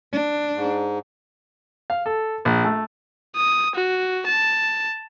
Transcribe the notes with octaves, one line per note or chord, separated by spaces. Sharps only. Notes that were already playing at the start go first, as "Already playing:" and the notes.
D4
G#2
F5
A4
A#1
A3
D#6
F#4
A5